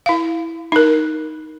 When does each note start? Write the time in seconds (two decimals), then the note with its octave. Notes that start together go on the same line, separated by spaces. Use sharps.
0.06 E4 F5
0.72 D#4 A#4